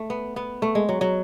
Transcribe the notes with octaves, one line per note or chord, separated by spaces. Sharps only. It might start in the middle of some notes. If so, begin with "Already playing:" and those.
Already playing: A3
B3
B3
A3
G#3
F#3
F#3